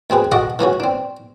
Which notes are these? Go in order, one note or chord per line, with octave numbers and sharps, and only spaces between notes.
D2 C4 G#4 B4
F#4 A4 D#5 F#5 A5 D6
E3 A3 C#4 F#4
C4 D4